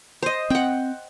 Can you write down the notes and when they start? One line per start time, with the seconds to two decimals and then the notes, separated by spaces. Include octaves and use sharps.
0.22 C5 D#5
0.50 C4 F#5 G5